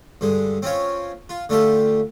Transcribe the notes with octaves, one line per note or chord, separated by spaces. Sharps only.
G2 D3 G#3
C4 C#4 F4 C#5
F4
D3 A3 F4 G4 A4